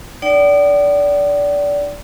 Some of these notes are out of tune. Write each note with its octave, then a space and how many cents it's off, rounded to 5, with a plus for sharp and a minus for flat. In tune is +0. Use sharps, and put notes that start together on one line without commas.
D#4 -40 D5 -25 G5 -45